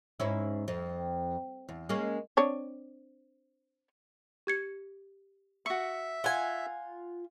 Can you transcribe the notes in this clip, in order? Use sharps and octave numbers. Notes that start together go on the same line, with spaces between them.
G#2 C#4 E4
F2
E2
G#3 A#3 C#4
C4 D4 C#5
G4 G#6 C#7
F#4 E5 C#6 C#7
F4 F#5 G#5